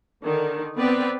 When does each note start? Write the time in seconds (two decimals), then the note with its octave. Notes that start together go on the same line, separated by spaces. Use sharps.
0.24 D3 D#3
0.77 B3 C4 B4 D5